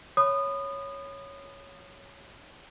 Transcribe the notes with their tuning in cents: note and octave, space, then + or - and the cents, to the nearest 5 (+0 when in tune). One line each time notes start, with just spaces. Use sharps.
C#5 +0 B5 +20 D#6 -25